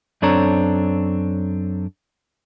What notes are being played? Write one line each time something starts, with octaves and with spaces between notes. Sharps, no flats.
F#2 C4 D4 A4 C#5 A#5